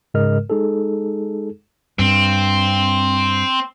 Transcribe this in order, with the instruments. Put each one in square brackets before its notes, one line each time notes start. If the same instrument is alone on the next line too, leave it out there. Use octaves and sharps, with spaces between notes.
[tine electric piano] G#2 C#3 G#3 A#4 D#5 F6
G#3 D#4 G#4 A4
[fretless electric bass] G2 [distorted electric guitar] C4